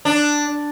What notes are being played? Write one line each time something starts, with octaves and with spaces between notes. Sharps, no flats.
D4